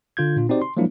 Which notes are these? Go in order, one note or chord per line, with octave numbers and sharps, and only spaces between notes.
D3 F4 G6 G#6
A#2 D4 F4
C4 D#4 F#4 G4 C5 D5
C6
F3 F#3 G#3 A#3 D4 E4